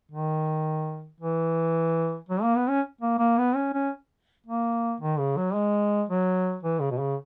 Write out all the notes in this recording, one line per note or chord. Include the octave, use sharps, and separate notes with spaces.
D#3
E3
F#3
A#3
B3
C#4
A#3
A#3
B3
C#4
C#4
A#3
D#3
C#3
F#3
G#3
F#3
E3
C#3
B2
C#3